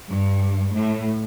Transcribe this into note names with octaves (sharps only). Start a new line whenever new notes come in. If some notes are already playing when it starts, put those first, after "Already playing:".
G2
A2